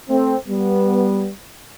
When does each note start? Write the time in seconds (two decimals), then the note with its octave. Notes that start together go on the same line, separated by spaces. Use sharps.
0.08 A3 C4
0.47 G3 B3